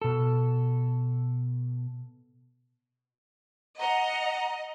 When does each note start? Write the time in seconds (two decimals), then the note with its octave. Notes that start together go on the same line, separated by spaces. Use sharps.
0.02 B2 A4
3.79 D#5 F#5 A#5